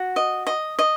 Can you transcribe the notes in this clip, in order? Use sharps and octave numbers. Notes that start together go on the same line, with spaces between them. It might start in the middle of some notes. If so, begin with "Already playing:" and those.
Already playing: F#4
D#5
D#5
D#5